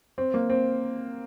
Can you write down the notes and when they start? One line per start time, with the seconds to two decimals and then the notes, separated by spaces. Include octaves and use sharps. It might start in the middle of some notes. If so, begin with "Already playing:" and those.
0.18 C4
0.34 A#3
0.50 C4